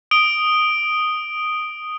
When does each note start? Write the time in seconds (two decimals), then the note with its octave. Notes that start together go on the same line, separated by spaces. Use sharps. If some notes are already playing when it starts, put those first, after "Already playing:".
0.11 D#6 D7 G7